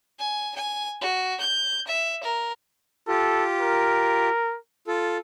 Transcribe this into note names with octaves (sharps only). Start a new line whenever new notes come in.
G#5
G#5
F#4
G6
E5
A#4
F4 G4 A4
A#4
F4 A4